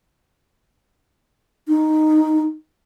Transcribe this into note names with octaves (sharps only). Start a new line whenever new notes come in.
D#4